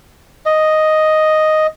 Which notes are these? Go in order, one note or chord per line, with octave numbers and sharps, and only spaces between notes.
D#5